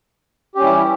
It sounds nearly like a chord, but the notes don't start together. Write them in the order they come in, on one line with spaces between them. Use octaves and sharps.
G4 C#4 G3 E4 E3